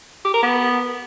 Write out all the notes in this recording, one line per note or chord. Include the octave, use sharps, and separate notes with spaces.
G4
A#4
B3